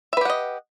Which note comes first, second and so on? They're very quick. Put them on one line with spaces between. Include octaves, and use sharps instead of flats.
E5 B4 G4 F#5 D#5